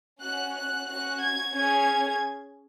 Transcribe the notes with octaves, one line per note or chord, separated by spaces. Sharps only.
C#4 F#4 F#6
F#6
C#4 F#4 F#6
G#6
C#4 G#4 G#6